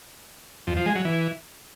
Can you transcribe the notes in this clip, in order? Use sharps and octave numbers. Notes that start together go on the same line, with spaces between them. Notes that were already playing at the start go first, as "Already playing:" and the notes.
F2
F3
G#3
F#3
E3